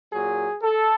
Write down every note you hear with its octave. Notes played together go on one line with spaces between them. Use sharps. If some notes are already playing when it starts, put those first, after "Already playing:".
A#2 F#3 G#4
A4